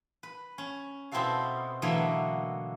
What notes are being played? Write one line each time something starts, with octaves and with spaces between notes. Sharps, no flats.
B4
C#4
B2 C4 E4 F#4 A4 F5
B2 D3 E3 F#3 A3 A#3